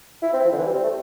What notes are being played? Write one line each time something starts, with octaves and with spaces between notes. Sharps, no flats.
E4
C4
F3
D3
E3
G3
C4
A3